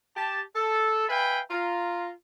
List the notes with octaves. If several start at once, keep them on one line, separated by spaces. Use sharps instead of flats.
G4 A5
A4
B4 E5 F5 G5 G#5 B5
F4 A#5